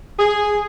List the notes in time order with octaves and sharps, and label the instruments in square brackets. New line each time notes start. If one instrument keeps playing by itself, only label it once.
[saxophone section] G#4